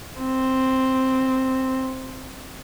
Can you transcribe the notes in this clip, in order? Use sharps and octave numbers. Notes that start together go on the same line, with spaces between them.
C4